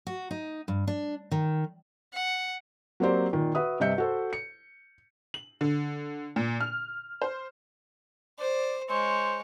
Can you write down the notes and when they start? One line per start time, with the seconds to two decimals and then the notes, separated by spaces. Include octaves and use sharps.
0.07 F#4
0.31 D#4
0.68 G2
0.87 D4
1.31 D#3
2.13 F#5
3.00 F#3 A#3 C4 G4 C5 D5
3.33 A#2 D#3
3.55 F#4 B4 E5 D#6
3.80 G2 C3 D#5 E5 G6 C#7
3.98 F#4 A4 C5
4.33 C#7
5.34 F#7
5.61 D3
6.36 A#2
6.60 F6
7.22 C5
8.39 C5 D5
8.89 G#3 C5 C#5